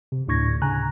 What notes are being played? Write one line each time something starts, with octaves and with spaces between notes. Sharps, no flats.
C3
D2 A2 D4 C#6 G#6 A#6
C#3 G#5 A#5 F#6